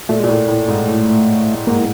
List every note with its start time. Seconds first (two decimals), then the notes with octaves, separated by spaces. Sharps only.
0.09 A#2 A3
0.19 A#2 G#3
0.28 A2 A3
0.48 A2
0.68 G#2
0.88 A2
1.67 G#2 A#3
1.76 A2